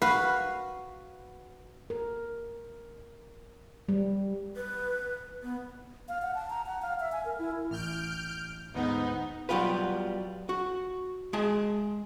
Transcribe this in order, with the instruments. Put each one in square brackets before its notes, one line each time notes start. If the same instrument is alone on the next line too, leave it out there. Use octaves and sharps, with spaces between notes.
[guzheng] F#4 B4 F5
[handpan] A#4
G3
[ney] B4
B3
[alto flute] F5
F#5
A5
A#5
F#5
F5
E5
G#5
A#4
E4
[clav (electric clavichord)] A1 [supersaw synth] F6 G6 D7
[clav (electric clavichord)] D2 G#2 [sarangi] B3 [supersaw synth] D#4
[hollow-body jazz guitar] F#3 G3 B3 F4 B4
F#4
G#3 G#4 A5